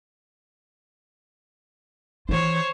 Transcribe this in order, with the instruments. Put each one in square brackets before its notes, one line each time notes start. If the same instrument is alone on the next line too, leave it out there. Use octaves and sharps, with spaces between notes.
[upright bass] E3 F4 [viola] C5 C#5